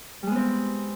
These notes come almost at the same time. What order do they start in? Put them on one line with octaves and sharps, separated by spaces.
G3 G#3 B3 C4